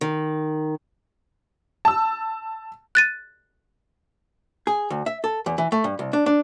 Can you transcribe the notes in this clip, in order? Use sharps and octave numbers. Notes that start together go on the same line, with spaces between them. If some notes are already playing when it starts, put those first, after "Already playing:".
D#3
A5 E6
F#6 A6 D#7
G#4
D2
E5
A4
E2
E3
A3
G2
C2
D4
D4